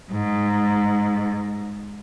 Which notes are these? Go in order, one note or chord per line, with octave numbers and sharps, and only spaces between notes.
G#2